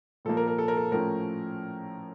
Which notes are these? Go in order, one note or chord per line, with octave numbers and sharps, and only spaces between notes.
A#2 F3 A#3 A4
A#4
A#4
A4
A#4
A4
A2 F3 A3 C#4 A#4